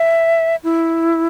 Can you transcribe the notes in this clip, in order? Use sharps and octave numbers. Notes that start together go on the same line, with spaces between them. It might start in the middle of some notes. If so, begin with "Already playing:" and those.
Already playing: E5
E4